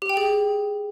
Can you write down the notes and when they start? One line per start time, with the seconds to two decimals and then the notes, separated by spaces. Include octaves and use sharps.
0.02 G4
0.09 G5
0.17 G#4